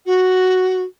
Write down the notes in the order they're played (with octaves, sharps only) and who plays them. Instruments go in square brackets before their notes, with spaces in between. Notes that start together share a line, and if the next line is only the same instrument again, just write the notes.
[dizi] F#4